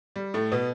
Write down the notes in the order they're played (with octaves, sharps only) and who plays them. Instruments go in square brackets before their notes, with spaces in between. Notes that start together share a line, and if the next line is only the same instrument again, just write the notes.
[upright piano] G3
A2 A3
B2 B3